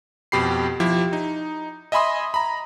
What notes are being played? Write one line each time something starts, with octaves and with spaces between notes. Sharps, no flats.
F2 B2 G4 B5 C7
F3 E4 G4
D#4
D#5 E5 G#5 B5 C6 D#6
A#5 B5